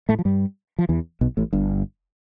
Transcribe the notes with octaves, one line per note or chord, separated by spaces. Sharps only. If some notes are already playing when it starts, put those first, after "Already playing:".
A2 A3
F3
G2 G3
F3
E2 E3
B1 B2
A1 A2
G1 G2